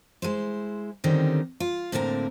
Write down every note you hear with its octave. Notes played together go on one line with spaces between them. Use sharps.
G#3 E4 C5
D3 D#3 G3 C4 C#4 D#4
F4
A2 D3 A#3 C4 A#4